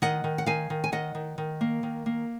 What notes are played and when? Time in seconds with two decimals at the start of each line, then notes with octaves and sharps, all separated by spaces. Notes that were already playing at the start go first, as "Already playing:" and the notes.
0.02 D#3 D#5 F#5
0.24 D#3
0.38 F#5
0.46 D#3 F5 G#5
0.70 D#3
0.84 G#5
0.92 D#3 D#5 F#5
1.15 D#3
1.38 D#3
1.61 A#3
1.83 D#3
2.06 A#3